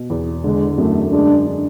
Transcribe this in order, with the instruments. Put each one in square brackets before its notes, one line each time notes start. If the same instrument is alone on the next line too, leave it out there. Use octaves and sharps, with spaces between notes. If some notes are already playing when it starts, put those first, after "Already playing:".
Already playing: [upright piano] B2
E2
[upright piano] D3 [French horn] G#3
[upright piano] F#2 [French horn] A3
[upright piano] G#3 [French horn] D4
[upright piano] D4